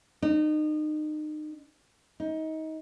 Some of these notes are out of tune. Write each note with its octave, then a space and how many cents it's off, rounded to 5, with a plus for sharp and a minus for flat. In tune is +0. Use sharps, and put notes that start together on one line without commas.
D#4 -30
D#4 +25